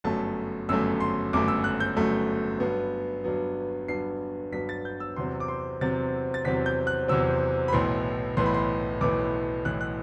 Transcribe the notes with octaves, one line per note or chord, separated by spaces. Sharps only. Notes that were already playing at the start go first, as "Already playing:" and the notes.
G1 F#2 F#3 A3 A5
G1 F#2 F#3 A3 E6
C6
G1 F#2 F#3 A3 D6
E6
F#6
G6
G1 F#2 F#3 A3
G2 F#3 B3
G2 F#3 B3
G2 F#3 B3 C7
G2 F#3 B3 B6
A6
G6
E6
E2 C3 F#3 C4 C6
D6
C6
E2 C3 F#3 C4 A6
A6
E2 C3 F#3 C4 B6
G6
F#6
E2 C3 F#3 C4 E6
B5
B1 A2 E3 B3 C6
B1 A2 E3 B3 C6
B5
C6
B1 A2 E3 B3 D6
B1 A2 E3 B3 F#6
F#6